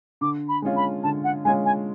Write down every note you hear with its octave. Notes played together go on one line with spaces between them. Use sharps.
D3 D6
B5
G#3 C#4 F4
B5
D3 A5
F#5
G#3 C#4 F4 G#5
G#5